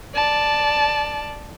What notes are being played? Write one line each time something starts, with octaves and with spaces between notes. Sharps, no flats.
D5 A5